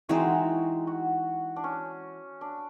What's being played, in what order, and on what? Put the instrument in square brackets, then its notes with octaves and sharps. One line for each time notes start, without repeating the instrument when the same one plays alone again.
[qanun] E3 G#3 C4 D#4 [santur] F#4
[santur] F#4
D4
C#4
D4